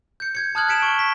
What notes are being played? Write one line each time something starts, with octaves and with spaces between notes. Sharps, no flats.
G6 C#7
G6 G#6 C#7
A5 D#6 F6 F#6 G#6 F#7
G#6 B6 C#7 D7 E7 F#7
C#6 G7
B6